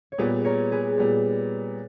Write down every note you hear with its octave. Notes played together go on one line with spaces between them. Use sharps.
C#5
A#2 G3 B3 G#4 B4
A#4 C#5
G#4 B4
A#2 G3 B3